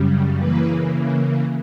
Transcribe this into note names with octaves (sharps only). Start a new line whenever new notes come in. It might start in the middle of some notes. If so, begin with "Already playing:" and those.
Already playing: F#2 C#3 G3
C#3 E3 A#3 B4